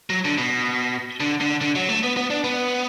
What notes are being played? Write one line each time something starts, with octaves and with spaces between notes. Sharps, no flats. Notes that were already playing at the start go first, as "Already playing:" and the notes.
F#3
D3
B2
D3
D3
D3
F#3
A3
B3
B3
D4
B3